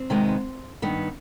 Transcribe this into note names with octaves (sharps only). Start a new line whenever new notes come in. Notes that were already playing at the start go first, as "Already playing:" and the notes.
Already playing: C4
C3 D#3 G#3 B3
G2 D#3 B3